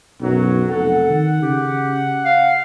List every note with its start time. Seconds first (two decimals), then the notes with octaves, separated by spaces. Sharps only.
0.21 B1 F#2 F#3
0.70 F1 A4 F#5
1.09 D#3
1.42 C#3 G4
2.25 F5